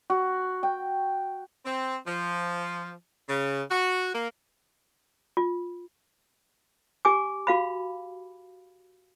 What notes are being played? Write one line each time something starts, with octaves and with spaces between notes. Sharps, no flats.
F#4
G5
C4
F3
C#3
F#4
A#3
F4
G4 G#5 D6
F#4 F5 B5